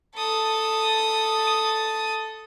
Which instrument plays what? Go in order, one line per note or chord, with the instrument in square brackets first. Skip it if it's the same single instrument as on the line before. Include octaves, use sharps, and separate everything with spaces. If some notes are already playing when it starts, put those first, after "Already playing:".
[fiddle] A4 D#6